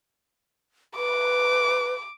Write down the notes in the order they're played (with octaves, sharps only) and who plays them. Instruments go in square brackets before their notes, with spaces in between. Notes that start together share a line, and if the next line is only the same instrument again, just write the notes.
[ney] B4 [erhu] D6